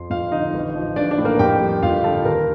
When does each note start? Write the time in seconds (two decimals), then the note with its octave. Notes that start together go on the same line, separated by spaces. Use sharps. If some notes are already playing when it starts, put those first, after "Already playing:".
Already playing: F2 F3 C6
0.10 F2 F4 F5
0.32 D3 D#4 D#5
0.54 A1
0.75 F3
0.96 A1 D4 D5
1.11 D4 D5
1.18 A2
1.25 A#3 A#4
1.39 F2 G4 G5
1.61 G3
1.82 F2 F4 F5
2.04 D3 A4 A5
2.25 D#2 A#4 A#5